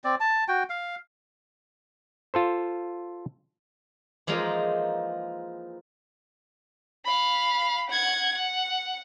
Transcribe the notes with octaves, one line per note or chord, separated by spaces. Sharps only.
C4 D5
A5
F#4 G5
F5
F4 A4 C5
E3 F3 G#3 A#3 D#4 F4
F5 B5
F#5 G#6
F#5